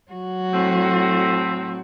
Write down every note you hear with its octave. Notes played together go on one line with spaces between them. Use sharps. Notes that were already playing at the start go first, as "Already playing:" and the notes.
F#3 F#4
A2 C4